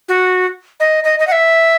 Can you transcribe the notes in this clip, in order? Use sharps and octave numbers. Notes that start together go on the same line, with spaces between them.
F#4
D#5
D#5
D#5
F#5
E5